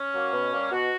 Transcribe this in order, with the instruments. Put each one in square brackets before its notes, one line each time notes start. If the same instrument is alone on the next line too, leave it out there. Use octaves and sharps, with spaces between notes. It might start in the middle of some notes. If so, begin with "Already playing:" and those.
Already playing: [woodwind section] C#4
F#3 A#3
B2
G3 A#3
B2 F#4